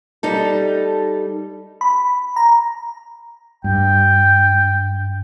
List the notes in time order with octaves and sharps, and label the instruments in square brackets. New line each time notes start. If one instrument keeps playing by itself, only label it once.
[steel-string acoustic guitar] G3 D#4 A4
[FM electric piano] B5
A#5
[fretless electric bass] G2 [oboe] G5